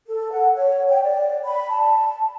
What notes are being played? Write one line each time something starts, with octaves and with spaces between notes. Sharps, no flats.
A4
F#5
C#5
G5
D5
B5
A5